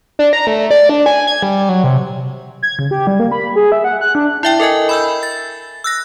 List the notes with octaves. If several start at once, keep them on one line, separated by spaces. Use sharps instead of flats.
D4
A#5
A3
D5
D4
G#5
G#6
G3
F#3
C3
G#6
C#3
G4
G3
A#3
B5
G#4
E5
F#5
F#6
D4
E4 E5 G5
A4 A#4 D#5 G#5
B5 E6 G6
A6
E6 F#6 A#6